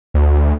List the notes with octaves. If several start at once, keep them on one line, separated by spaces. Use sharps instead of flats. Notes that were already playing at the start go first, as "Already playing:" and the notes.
D2